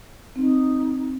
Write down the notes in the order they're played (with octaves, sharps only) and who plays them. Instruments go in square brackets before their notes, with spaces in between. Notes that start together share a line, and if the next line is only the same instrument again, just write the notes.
[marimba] C4 [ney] D#4